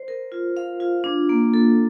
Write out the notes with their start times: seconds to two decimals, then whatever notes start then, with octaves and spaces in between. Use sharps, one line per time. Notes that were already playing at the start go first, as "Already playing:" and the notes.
Already playing: C5
0.08 A#4
0.32 F4
0.57 F5
0.80 F4
1.04 D4
1.29 A#3
1.54 A4